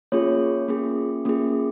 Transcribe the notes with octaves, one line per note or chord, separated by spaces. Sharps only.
A#3 C#4 F4 G#4 C#5
A#3 C#4 F4 G#4
A#3 C#4 F4 G#4